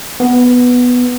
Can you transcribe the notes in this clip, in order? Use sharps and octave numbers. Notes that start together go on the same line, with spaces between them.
B3